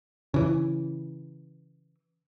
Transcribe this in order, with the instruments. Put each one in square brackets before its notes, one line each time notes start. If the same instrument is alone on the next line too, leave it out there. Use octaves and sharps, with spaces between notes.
[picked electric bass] C#3 E3